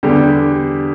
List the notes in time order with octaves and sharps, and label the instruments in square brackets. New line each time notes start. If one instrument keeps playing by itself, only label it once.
[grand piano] E2 D3 G3 D4 G4